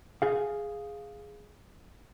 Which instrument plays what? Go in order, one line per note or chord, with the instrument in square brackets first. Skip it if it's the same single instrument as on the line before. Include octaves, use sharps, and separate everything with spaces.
[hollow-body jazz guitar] G#4 F5